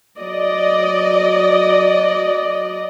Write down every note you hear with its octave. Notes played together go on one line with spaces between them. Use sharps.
F#3 D5 D#5